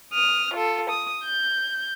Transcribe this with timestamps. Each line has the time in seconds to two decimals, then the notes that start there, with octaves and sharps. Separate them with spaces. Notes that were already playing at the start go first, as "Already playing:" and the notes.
0.13 D#6 F6
0.54 F4 A4
0.90 D#6
1.24 G6